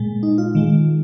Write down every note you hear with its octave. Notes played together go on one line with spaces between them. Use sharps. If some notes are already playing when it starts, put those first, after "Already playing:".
Already playing: A#2 G#3
D#4
F4
D#3 G#3